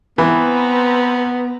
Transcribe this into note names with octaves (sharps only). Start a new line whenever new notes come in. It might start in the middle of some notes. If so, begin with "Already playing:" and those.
E3 B3 C4 B4 A#5